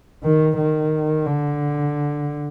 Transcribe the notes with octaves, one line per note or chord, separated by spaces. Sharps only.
D#3
D#3
D3